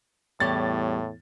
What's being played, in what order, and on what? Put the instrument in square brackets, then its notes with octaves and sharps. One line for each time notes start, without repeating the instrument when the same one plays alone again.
[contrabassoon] E2 [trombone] A2 [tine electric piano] G3 G4 C#5 [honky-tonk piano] A6